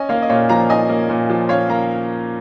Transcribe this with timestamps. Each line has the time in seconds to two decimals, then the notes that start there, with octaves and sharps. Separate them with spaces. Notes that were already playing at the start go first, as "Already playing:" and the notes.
Already playing: C#4 D#5 G#5
0.09 A#3 C#5 F5
0.22 D#5
0.29 A#2 C#5 F5
0.49 F3 F5 A#5
0.69 C#4 D#5 G#5
0.89 A#3
1.09 A#2
1.30 F3
1.49 C#4 C#5 F5
1.69 A#3 F5 A#5